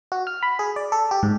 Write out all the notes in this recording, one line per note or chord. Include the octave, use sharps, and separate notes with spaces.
F#4
F6
B5
G#4
D5
A4
G4
G#2